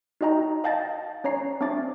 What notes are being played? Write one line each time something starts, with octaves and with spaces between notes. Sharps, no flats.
D#4 F#4 D#5 G5 A#5
D#5 F5 G5 A5 A6 A#6
C#4 C#5 A#5 C7
C4 D4 E5 D6 A6